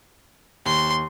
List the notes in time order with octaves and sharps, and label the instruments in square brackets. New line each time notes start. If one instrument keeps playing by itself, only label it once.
[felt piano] D#2 [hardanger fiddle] C6